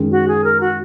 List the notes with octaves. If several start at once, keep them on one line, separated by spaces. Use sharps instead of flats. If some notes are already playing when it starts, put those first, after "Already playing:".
Already playing: F#2 D#3 G#3 C#4
F#4
G#4
A#4
F#4